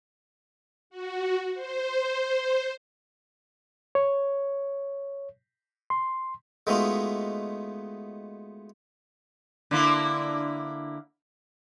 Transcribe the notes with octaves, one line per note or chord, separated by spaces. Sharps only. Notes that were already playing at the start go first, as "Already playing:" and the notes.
F#4
C5
C#5
C6
G#3 A3 B3 D#4 F4 F#4
D3 A#3 E4